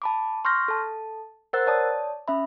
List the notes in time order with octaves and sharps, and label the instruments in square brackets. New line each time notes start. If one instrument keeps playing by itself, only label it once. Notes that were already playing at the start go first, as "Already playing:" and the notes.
[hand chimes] A5 B5 D6
C6 C#6 F6 G6 A#6
A4 A5
A#4 C5 F#5 E6 F#6 A6
C#5 D5 A5 D#6
C#4 E5 B5